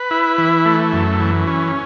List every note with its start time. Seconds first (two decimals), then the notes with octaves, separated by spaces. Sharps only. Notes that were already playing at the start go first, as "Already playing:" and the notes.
Already playing: B4
0.11 E4
0.38 E3
0.66 A3
0.93 F#2
1.20 E3
1.47 C#4